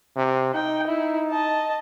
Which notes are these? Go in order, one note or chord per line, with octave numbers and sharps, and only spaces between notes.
C3
D#4 G5
E4
D#5 A5